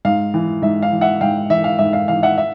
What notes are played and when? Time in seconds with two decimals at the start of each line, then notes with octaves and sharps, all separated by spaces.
0.05 G#2 F5
0.34 E3
0.62 G#2 E5
0.82 F5
0.92 E3
1.01 E5 F#5
1.21 G#2 F5 G5
1.50 E3 E5
1.64 F5
1.78 G#2 E5
1.93 F5
2.08 E3 F5
2.23 E5 F#5
2.38 E5